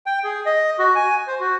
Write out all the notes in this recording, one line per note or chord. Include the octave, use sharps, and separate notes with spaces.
G5
G#4
D#5
F#4
G#5
C5
F#4